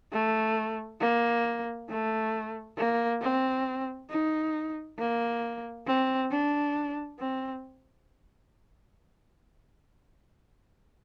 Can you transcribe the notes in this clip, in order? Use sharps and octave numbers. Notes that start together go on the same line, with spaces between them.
A3
A#3
A3
A#3
C4
D#4
A#3
C4
D4
C4